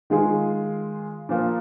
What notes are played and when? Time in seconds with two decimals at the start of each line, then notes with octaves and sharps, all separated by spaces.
0.10 D#3 G#3 F4 G#4
1.29 A#2 F3 A#3